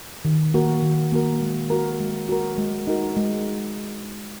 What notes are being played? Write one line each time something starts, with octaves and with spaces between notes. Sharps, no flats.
D#3
A#3 F#4 A#4
D#3
A#3 F#4 A#4
G#3
F#4 A#4
G#3
F#4 A#4
G#3
D#4 F#4 A#4
G#3